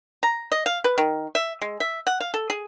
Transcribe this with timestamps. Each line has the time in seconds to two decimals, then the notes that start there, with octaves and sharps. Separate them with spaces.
0.23 A#5
0.52 D#5
0.66 F5
0.84 B4
0.98 D#3
1.35 E5
1.62 G#3
1.80 E5
2.07 F#5
2.20 F5
2.34 A4
2.50 G#4